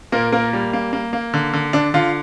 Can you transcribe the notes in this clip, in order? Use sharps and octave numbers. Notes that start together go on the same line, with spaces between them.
A#2 A#3 A#4
A#3 A#4
G3
A#3
A#3
A#3
D3
D3
D3 D4
D3 F4